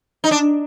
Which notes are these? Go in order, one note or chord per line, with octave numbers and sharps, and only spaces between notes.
D#4
D4